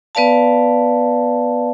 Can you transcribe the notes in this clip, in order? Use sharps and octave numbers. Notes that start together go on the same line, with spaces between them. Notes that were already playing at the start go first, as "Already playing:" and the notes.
B3 B4 D5 F5 A5